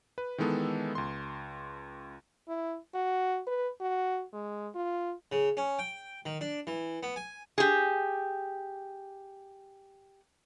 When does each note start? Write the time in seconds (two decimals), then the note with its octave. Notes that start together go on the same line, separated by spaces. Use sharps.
0.18 B4
0.38 D#3 E3 G#3 B3 A4
0.95 C#2 C6
2.48 E4
2.94 F#4
3.47 B4
3.81 F#4
4.33 G#3
4.75 F4
5.32 C#3
5.57 C#4
5.79 G5
6.26 D#3
6.41 D4
6.67 E3
7.03 B3
7.16 G#5
7.58 G4 G#4